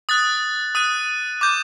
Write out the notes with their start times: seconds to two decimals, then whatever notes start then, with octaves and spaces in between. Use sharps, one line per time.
0.09 D#6 F#6 A6
0.75 D#6 F#6 D#7
1.41 D6 G6